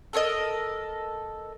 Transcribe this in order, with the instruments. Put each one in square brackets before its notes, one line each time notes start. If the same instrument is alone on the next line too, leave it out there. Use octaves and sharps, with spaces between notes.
[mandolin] A4 A#4 C#5 D#5